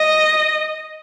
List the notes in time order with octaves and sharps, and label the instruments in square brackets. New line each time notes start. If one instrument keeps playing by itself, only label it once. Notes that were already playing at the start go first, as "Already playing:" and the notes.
Already playing: [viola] D#5